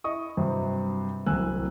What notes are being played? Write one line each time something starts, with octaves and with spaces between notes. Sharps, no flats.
E4 D#5 C#6 D#6
G2 C3 F#3 C4
D1 C2 C4 G#5 E6 F#6